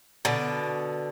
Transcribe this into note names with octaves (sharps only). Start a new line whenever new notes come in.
B2 D3